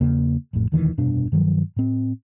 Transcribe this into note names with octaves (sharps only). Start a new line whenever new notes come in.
E2 C#3 A#3
A1 F2 A2
E1 D2 D#3 E3
F1 G2 B2 D4
G2 D#3 F3 F#3
A2 C4